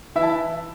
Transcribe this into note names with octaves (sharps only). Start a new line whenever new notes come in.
E3 E4 E5
A5